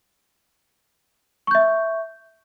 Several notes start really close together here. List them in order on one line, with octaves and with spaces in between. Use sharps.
C#6 G6 E5